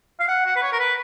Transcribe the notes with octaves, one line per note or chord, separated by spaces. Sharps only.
F5
F#5
F#5
B4
C#5
A#4
B4